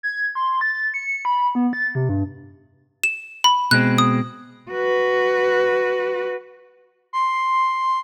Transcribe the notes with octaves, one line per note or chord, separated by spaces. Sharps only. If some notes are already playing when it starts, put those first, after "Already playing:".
G#6
C6
A6
C#7
B5
B3
A6
C3
G2
E7
B5
B2 G#3 C4 F#6
D#6
F#4 B4
C6